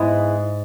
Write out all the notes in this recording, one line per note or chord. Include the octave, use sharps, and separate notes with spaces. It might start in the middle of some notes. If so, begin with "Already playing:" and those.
Already playing: G#2 G#3 B3 E4 G#4